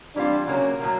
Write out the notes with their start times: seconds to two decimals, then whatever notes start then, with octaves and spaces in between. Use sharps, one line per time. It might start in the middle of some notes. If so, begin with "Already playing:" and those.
0.15 E3 G3 C4 D4 F4
0.47 C#3 F#3 A#3 C#4
0.80 A2 F#3 A#3